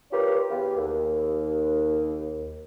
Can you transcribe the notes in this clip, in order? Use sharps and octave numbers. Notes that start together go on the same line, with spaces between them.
D4 F4 G4 A#4 B4 C#5
E2 B3 G4 F5
D#2